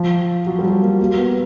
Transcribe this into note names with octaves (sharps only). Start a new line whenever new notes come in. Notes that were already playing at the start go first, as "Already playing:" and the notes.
Already playing: F3
F#3
G3
F#3
A#3
A#3
B3